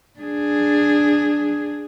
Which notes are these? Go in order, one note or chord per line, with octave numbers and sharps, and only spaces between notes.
D4 G#4